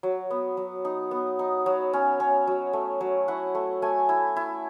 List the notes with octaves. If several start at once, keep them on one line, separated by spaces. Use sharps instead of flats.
F#3
B3
F#3
D#4
B3
D#4
F#3
C#4
C#4
F#3
A3
F#3
E4 F#5
A3
A3 G#5
E4
E4